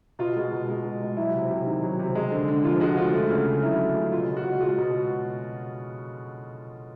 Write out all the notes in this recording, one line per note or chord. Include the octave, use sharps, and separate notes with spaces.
B2 F4
G#3
B2
G#3
B2
G#3
F#3 E4
C3
C3
D#3
F#3
C3
G#3
D3
D3
F3 F4
G#3 F#4
D3 F4
A3 F4
C#3
C#3
F#3 E4
A3
C#3
B2 F4
G#3
F#4
B2
G#3 F4
B2